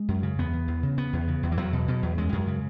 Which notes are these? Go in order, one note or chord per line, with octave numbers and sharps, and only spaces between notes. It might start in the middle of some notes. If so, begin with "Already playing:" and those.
Already playing: G#3
F#2
C#3
E2 B3
E2
E2
C#3
C#3 B3
E2
C#3
E2
E3
E2 F#3
B2
B2
E2
F#2 G#3
F#2
C#3